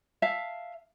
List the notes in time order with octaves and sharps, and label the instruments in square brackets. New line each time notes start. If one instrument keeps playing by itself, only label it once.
[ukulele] E5 F5 A5